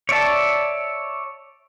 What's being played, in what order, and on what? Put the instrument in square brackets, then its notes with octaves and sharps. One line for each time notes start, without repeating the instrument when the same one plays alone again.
[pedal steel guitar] C#5 D5 E5 A5